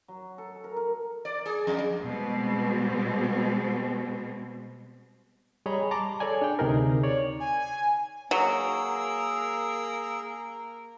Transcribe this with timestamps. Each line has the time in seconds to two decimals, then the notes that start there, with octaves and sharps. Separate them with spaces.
0.08 F#3
0.38 A4
0.64 A#4
0.77 A#4
1.25 D5
1.46 G#4
1.67 F2
2.03 B2 G3 G#3 C4
5.66 G3 G#4 C#5 D#5 A#5 B5
5.91 A5 A#5 C6 D6
6.20 G#4 A4 C#5 D5 G#5
6.42 D4 G5
6.59 D2 C3 D#4 G#4 A#4
7.03 C#5 D5
7.40 G#5
8.31 F#3 A#3 G#4 A#4 E6